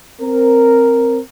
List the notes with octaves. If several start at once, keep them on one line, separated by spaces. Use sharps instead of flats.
C4 A#4